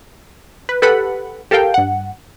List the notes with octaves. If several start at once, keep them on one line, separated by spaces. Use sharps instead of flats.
B4
G4 A4 B4 F#5 B5
G4 A4 A#4 F5 G5
G2 F#5